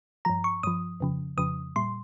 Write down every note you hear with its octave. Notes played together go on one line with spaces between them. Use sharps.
G2 F3 A#5
C#6
G2 F3 D#6
F2 C#3 F3
F2 C#3 F3 D#6
A#2 G3 C6